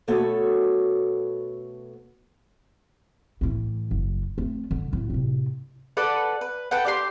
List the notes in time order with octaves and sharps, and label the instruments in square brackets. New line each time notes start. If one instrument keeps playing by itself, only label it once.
[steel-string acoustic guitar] B2 A3 B3 F#4 A4 C#5
[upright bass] A2 E3
F#1
A3 C4
D3
A1
A2 C3
[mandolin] A4 B4 D5 F#5
B4
A4 B4 F#5 G5
D4 G4 C6